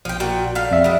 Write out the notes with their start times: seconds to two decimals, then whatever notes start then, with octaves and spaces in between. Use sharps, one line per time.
0.05 A#1 F3 G5
0.20 A#2 F#4 G5
0.55 D3 F5
0.71 F2 E5
0.84 G3 G#3